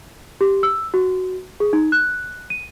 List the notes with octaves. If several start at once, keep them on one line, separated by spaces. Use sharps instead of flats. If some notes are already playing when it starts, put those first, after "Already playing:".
G4
E6
F#4
G#4
D#4
F#6
D#7